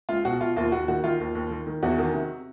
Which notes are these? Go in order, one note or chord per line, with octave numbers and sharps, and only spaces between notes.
C#2 F4
B2 F#4
B2 F4
D#2 F4
D#2 F#4
D#3 F#4
D#3 F4
D#2
D#2
D#3
D#3
E2 F#4
D#3
C3